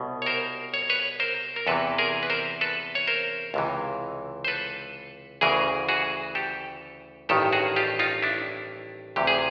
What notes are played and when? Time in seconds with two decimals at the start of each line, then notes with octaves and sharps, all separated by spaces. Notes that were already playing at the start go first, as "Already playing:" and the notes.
Already playing: C2 B2
0.22 C#5
0.26 A#4 C5
0.74 C#5
0.90 B4 C#5
1.20 A#4 C5
1.56 A#4
1.67 E2 C3 E3 A4 B4
1.98 G#4 A#4
2.23 B4
2.30 A#4 C5
2.61 A4 B4
2.95 C#5
3.07 A#4 C5
3.54 C#2 C3 E3
4.45 C5
4.48 A4 B4
5.41 D2 C#3 E3 G#4 A#4
5.89 F#4 G#4
6.35 G4 A4
7.29 A1 G2 D#3 G4 A4
7.53 F#4 G#4
7.76 F4 G4
7.99 D#4 F4
8.22 D4 E4
9.16 D2 C3 E3 G4
9.27 G#4